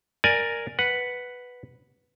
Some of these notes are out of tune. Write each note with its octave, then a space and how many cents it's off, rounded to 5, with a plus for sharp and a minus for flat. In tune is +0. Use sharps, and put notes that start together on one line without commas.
A#4 +0 D5 +10 G#5 +0
B4 +0 F#5 +0